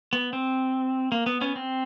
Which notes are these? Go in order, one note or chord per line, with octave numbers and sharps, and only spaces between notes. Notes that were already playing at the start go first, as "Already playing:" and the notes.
B3
C4
A#3
B3
B3 C#4
C4